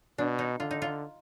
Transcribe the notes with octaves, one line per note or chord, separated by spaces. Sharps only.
B2 D4
D#4
D3 F4
D#4
F4